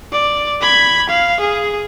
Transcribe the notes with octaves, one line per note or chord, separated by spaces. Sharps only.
D5
B5 G#6
F5
G#4